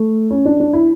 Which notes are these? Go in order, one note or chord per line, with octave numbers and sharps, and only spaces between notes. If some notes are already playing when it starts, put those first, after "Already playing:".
Already playing: A3
C#4
D4
D4
E4